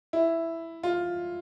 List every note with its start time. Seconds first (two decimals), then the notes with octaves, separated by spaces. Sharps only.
0.13 E4
0.83 F4